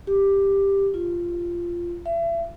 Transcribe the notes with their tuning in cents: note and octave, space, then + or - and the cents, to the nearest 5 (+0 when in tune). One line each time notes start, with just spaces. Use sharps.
G4 +10
F4 -10
E5 +35